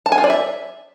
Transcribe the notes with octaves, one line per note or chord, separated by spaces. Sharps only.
A5
G#5
F4
D5
E5